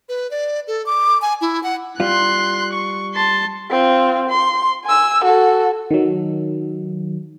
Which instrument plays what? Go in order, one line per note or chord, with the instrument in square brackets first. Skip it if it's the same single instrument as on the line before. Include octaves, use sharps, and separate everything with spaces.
[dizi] B4
D5
A4
D6
G#5
E4
F#5
[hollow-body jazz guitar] G3 F4 [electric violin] C6 F#6
[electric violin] C#6
A5 C6
[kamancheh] C4 F4
C6
G#5 E6
F#4 A4
[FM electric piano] D#3 F#3